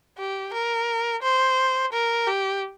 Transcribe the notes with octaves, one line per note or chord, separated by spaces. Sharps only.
G4
A#4
C5
A#4
G4